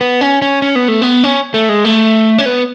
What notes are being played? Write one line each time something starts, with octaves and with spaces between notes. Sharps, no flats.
B3
C#4
C#4
C#4
B3
A3
B3
C#4
A3
G#3
A3
C#4
B3